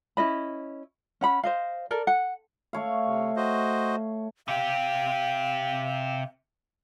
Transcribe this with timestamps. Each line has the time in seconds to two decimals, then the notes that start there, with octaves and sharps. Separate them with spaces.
0.17 C#4 E4 D#5 B5
1.21 C#4 F#5 B5
1.43 C5 D#5 F5
1.91 A4 A#4 D5
2.07 F#5
2.73 A3 C#5 F5
3.06 C3
3.36 F#4 C5 D#5
4.48 C3 G4 F5